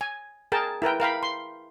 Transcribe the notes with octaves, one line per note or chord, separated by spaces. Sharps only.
G#5
G#4 A#4 G5 A5
E4 A#4 B4 G5
A#4 F5 G5 B5
C6